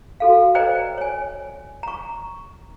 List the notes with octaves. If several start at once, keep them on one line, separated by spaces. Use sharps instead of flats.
F#4 A4 F5
B4 C5 D5 D#5 G5 A#5
C#5 G#5
A#5 C#6